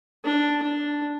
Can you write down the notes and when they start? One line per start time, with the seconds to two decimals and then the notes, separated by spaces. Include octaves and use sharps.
0.25 D4
0.63 D4